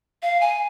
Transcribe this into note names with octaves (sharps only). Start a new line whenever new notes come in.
F5
G#5